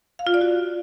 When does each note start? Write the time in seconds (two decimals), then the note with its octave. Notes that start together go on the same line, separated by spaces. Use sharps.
0.19 F5
0.27 F4
0.34 D5
0.41 F#4